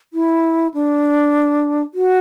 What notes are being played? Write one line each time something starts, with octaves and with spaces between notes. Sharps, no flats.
E4
D4
F#4